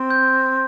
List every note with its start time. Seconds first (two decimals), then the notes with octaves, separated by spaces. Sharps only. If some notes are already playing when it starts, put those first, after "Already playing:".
Already playing: C4
0.10 G6